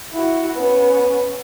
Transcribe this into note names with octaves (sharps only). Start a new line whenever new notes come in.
E4 F#4
B3 C#4